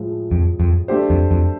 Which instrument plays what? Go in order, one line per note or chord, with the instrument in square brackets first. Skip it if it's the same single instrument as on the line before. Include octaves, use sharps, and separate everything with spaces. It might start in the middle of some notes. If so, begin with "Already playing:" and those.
Already playing: [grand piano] A2 F3 G#3
[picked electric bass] F2
F2
[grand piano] A3 D4 G4 C5
[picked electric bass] F2
F2